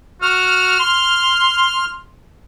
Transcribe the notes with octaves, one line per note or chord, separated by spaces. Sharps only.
F#4 F6
C6